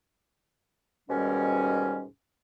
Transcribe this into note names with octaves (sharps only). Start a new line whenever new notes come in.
D#2 G#2 B2 G3 C#4